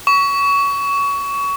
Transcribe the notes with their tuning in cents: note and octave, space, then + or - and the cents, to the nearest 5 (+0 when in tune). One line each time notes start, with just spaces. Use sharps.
C#6 +25